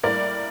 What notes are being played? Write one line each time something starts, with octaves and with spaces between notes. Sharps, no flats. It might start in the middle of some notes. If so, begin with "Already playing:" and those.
A2 G3 A#3 A#4 D5